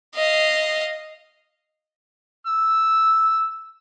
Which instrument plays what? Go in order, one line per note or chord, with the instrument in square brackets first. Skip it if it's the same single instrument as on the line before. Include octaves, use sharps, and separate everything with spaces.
[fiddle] D#5 F5
[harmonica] E6